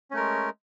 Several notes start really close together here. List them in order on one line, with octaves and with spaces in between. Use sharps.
C#4 A3 A#4 G#3